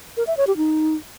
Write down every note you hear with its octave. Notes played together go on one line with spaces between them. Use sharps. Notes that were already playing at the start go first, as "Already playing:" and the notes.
A#4
E5
C#5
G4
D#4